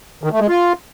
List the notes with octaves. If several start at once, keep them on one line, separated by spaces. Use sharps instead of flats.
D#3
A3
G#3
F4